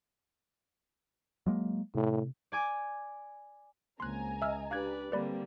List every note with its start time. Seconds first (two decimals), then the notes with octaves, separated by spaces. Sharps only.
1.46 F#3 G#3 A#3
1.95 A2 C3
2.52 D5 G#5 D6
4.00 C#2 A#3 C4 G#5 A#5 C6 F#6
4.42 D#5 E5 E6 F6
4.71 D4 G4 B4 D5 F5 F#6 G#6
5.12 D3 G3 A#3 C4 B4 D5 B5